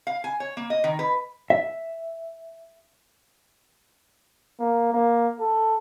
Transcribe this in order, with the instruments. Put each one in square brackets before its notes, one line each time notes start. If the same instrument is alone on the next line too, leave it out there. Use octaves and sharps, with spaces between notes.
[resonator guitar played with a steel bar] F5
G#5
C#5
A#3
D#5
D#3
B4
[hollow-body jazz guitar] E5
[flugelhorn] A#3
A#3
A4